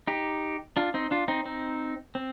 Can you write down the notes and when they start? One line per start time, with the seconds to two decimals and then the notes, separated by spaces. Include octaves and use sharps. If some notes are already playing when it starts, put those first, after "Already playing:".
0.07 D#4 G4
0.77 D4 F4
0.94 C4 D#4
1.11 D4 F4
1.28 C4 D#4
1.45 C4 D#4
2.15 C4